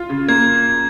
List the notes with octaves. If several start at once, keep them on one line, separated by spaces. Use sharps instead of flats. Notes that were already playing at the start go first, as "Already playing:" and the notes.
Already playing: F4
C#3
A#3 G#6